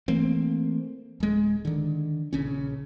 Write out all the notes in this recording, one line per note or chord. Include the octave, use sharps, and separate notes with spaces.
E3 A3 A#3 C4
D1 G#3
D3 D#3
A#1 C#3 C#4